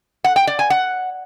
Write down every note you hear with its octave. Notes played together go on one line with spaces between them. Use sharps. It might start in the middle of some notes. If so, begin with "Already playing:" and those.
F#5
G5
D5
G#5
F#5